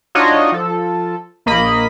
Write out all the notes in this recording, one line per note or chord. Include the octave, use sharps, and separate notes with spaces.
D4 D#4 F4 F#4 C#5 D#5
F3 A4
A#1 A#3 D#5 B5